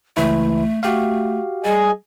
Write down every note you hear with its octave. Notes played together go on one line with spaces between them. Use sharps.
C#2 E3 A3 E4
A3 F#4 G4 F5
G3 G#4 D#5 G#5